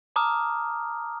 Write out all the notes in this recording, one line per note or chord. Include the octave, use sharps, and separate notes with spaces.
A5 A#5 D6 D#6 F6